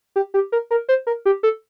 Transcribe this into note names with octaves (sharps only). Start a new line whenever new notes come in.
G4
G4
A#4
A#4
C5
A#4
G4
A4